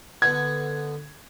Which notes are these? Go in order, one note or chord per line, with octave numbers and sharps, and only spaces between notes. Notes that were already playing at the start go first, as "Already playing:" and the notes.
D3 B3 G#6